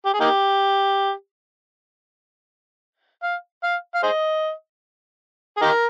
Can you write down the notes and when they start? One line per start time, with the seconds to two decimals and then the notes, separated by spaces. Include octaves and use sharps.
0.06 G4
0.14 G#4
0.20 A#3 D#4 G4
3.23 F5
3.63 F5
3.95 F5
4.03 G#4 C5 D#5
5.57 G#4
5.62 D#4 G4 A#4